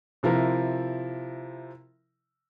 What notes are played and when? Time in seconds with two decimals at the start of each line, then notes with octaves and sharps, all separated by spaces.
0.23 C3 F3 E4 A#4